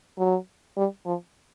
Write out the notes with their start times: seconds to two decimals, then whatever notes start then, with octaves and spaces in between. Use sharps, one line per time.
0.18 F#3
0.77 G3
1.06 F3